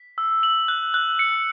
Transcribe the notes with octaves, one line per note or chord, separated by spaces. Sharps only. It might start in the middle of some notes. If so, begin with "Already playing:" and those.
Already playing: B6
E6
F#7
F#6
F#6
C#7